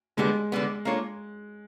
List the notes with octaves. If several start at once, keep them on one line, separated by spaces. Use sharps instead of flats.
D3 G3 G#3 B3
D3 G3 B3
A#3 D4 F4 A4 C#5